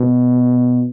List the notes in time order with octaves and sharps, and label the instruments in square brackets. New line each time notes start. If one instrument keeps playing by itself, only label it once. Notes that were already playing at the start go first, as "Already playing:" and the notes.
Already playing: [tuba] B2